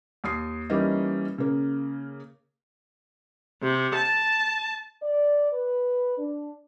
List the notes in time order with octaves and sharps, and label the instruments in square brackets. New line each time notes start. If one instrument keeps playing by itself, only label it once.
[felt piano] D#2 D#6 C7
E3 G3 A#3 C#4 D#4
C#3 A#3
[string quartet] C3
A5
[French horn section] D5
B4
D4